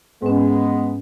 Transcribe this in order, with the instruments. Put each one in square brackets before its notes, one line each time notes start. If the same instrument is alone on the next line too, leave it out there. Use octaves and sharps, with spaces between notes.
[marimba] G#2 C#4 [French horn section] G#3 B3